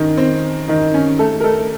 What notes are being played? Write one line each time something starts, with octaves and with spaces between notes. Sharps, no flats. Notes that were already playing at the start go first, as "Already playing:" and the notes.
Already playing: D#3 C#4 D#4
C4
D#3 D#4
C#4
A3 A4
A#4
A3 A4